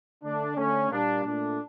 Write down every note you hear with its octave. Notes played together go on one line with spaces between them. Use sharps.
D3 A3 D4
D3 A3 C#4
A#2 G3 A#3 D4
A#2 A3 D4